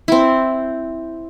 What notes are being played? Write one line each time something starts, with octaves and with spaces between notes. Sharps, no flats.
C4 E4